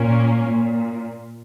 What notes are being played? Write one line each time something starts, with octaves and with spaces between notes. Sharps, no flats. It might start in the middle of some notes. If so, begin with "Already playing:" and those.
Already playing: A#2 A#3 C#4
A#2